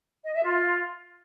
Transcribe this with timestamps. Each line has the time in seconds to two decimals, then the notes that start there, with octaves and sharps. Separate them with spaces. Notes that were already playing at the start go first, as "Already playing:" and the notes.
0.24 D#5
0.34 E5
0.44 F4